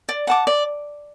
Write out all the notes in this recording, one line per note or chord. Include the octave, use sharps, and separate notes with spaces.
D5
F#5 A5 D6
D5